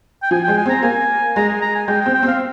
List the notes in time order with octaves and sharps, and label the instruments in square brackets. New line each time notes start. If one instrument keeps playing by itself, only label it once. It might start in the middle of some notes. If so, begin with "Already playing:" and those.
[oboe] G5
[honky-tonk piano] F3 [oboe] G#5
[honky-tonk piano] G#3 [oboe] G5
[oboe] G#5
[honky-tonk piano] C4 [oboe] A#5
[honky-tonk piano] A#3 [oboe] G#5
[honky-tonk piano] G#3 [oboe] A#5
[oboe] G#5
A#5
G#5
[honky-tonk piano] G#3 [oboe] G5
[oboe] G5
[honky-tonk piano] C4
[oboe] G5
[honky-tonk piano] C4 [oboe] F5